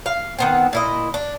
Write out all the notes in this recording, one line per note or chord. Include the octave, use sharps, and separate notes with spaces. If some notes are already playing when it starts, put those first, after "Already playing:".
F5
D#3 B3 C4
A#2 E4 D#5
D4